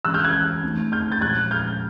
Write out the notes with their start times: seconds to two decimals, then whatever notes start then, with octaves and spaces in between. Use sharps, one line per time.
0.05 E3 G#3 C#4 E6 F#6
0.14 F6 G6
0.24 F#6 G#6
0.63 A3 C4 D#4
0.92 F6 G6
1.12 G6 A6
1.21 A#2 F3 G#3 F#6 G#6
1.51 F6 G6